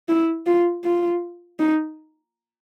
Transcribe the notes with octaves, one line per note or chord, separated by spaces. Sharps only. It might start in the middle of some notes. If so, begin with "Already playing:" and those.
E4
F4
F4
D#4